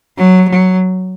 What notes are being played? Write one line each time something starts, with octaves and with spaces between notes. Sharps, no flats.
F#3
F#3